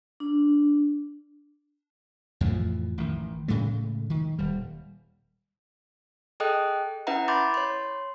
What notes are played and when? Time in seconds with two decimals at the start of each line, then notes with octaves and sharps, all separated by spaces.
0.20 D4
2.41 F2 A2 E3 F3
2.98 A1 D#3
3.48 A2 C#3 G#3 A3
4.10 D#3
4.38 D#1 G3
6.40 G#4 A4 D#5 G5 D#6 F#6
7.07 C#4 E4 B4 E5 F#5 A#5
7.28 B5 C6 D6 G6 A6
7.54 C#5 C6